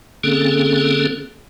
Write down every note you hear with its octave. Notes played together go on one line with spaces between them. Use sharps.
D3 A#3 C4 C#4 G#4 A4